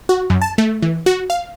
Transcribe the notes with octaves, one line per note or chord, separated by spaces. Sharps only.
F#4
F#2
A5
A3
E3
F#4
F5